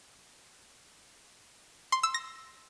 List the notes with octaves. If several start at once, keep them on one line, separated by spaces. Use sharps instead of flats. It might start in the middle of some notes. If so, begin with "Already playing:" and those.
C6
E6
A#6